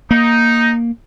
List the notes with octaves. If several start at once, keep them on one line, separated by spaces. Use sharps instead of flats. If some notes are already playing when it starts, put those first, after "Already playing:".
A#3 D#4